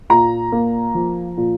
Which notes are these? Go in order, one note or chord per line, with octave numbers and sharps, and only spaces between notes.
A#2 A#5
A#3
F3
A#2